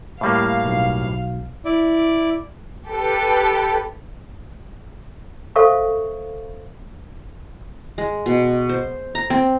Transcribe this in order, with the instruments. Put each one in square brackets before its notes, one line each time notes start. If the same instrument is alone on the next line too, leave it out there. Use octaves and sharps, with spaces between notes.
[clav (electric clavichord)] A2 G3 A#3 [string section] F5
[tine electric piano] B1
[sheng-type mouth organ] E4 D5
[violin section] G4 A4 B4
[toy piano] A4 C5 E5 F5 C#6
[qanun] G#3
B2
C5
A#5
C4